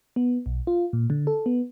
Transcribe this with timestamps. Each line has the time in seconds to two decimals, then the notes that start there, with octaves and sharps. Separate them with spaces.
0.16 B3
0.46 B1
0.67 F4
0.93 A#2
1.10 D3
1.27 A4
1.46 B3